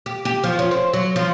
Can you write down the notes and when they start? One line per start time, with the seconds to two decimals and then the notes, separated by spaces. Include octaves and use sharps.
0.06 G4
0.25 G4
0.44 F3
0.59 C#4
0.71 C4
0.93 F#3
1.16 F3